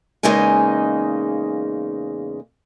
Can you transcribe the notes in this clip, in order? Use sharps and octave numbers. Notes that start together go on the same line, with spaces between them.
E2 C#3 G#3 A#3 D#4 G#5